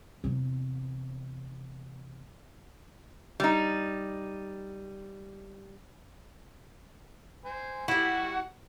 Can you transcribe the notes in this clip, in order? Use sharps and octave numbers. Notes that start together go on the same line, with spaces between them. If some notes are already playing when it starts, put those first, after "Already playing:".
E2 C3
G3 D#4
C5 G#5
G3 E4 F#4 G4 F#5